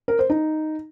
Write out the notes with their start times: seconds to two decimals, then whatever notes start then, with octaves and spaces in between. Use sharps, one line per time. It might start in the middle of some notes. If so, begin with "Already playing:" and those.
0.08 A#4
0.19 C5
0.30 D#4